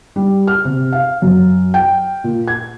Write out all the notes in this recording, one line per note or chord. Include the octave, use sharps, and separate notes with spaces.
G3
F6
C3
F5
F#2
G5
A#2
G#6